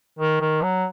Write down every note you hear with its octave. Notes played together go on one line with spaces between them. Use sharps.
D#3
D#3
F#3